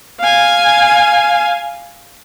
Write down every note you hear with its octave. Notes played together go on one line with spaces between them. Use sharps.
F5 G#5